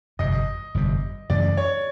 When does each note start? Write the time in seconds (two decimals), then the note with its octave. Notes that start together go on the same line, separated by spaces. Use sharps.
0.19 G1 F2 C3 D#5
0.75 G1 F2 C3
1.30 F#2 C#3 E3 A3 D5
1.57 C#5